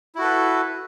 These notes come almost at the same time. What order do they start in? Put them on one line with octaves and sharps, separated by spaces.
E4 F#4 A4 B4